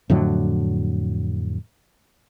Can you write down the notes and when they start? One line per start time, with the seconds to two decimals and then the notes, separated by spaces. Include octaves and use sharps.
0.10 F2 A2 D3 F#3